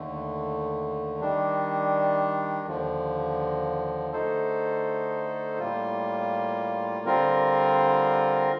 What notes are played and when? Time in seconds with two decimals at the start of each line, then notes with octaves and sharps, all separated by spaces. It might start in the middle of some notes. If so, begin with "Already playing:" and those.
Already playing: D#2 D3 A3
1.20 D#3 G3 D4
2.67 D#2 D3 F3
4.13 D3 A3 D#4 A4 C5
5.59 A2 G3 A#3 F4
7.06 D3 G3 C4 F4 A#4